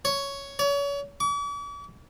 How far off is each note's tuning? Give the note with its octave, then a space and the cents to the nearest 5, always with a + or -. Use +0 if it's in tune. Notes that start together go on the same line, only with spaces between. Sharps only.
C#5 +5
C#5 +35
D6 -45